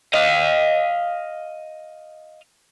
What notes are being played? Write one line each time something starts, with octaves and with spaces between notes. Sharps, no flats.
D#5 F5